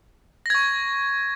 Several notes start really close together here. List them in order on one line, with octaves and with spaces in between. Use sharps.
A#6 G#6 C#6